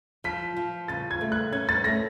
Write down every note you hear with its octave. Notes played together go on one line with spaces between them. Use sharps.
F3 B6
F3
C#3 A6
G#6
A3
F#6
C#4 G#6
A6
A3 A#6